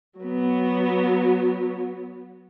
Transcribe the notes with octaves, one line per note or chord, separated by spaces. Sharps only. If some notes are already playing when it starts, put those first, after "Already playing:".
F#3 B3